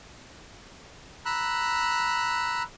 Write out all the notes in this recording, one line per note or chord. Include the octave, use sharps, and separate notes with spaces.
A#5 B5 E6 F#6